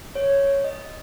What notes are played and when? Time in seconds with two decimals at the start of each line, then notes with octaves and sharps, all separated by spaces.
0.15 C#5
0.64 D#5